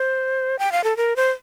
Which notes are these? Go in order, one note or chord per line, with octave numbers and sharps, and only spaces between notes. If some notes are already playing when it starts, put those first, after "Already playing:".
Already playing: C5
G5
F5
A4
A#4
C5